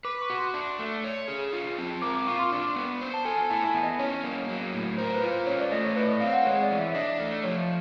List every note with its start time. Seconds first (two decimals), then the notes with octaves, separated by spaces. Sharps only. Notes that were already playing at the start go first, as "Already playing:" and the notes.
0.05 B4 D6
0.22 C#6
0.30 F#4
0.38 C6
0.54 D4
0.79 A3
1.04 C#5
1.28 G#4
1.53 F4
1.78 C4
2.02 A#4 D6
2.15 D6
2.27 F4 C#6
2.39 C6
2.52 D4
2.76 B3
3.01 C5
3.14 A5
3.25 A4 G#5
3.38 G#5
3.50 E4 A5
3.67 G#5
3.74 B3
3.83 D#5
3.99 C#4 C#5
4.24 A#3
4.49 F#3
4.73 A2
4.98 A#4 C5
5.15 B4
5.23 F4
5.31 C5
5.47 C#4 C#5
5.60 D5
5.71 A3 D#5
5.84 C#5
5.96 E4 B4
6.08 D#5
6.20 C4 F5
6.33 F#5
6.45 G#3 C#5
6.63 D5
6.71 E3
6.79 E5
6.94 D4 D#5
7.19 A3
7.44 F3 C#5